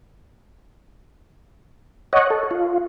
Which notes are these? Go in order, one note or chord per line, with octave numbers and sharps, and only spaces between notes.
C#5 D#5 F#5
A4
F4